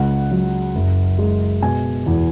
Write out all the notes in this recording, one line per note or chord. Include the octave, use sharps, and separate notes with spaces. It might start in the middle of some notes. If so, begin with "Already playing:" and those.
Already playing: C#2 C#3 F#5
F#3
F#1
G#3
B2 G#5
E2